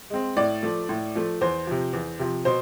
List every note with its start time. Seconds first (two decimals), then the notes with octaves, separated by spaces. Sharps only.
0.10 G#3 C4
0.37 A2 D5
0.63 F3 A3
0.89 A2
1.15 F3 A3
1.41 E2 C5
1.67 C3 F3
1.93 E2
2.19 C3 F3
2.45 B2 C5